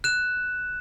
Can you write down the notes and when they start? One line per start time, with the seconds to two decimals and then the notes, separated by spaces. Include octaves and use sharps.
0.04 F#6 E7